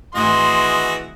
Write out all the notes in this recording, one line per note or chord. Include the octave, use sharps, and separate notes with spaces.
G#1 E3 A3 F#4 G#4 D#5 C6